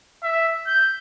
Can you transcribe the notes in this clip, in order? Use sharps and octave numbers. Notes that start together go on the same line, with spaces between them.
E5
G6